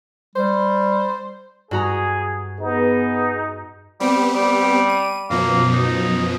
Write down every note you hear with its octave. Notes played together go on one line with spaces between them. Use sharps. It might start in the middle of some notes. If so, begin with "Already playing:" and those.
G3 C5
G2 F#4 G#4 A#5
B3 D#4 G#4
G3 B3 C4 G4
G3
D#7
F#2 B2 F3 A#3
D#4